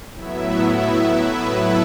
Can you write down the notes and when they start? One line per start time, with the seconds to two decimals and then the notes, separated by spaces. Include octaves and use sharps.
0.15 A2 F#3 B3 E4 E5
0.60 E4 E5
1.05 B3 B4
1.50 A4